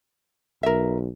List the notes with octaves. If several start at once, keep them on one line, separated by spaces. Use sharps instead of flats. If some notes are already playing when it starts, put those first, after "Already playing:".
B1 A#4 E5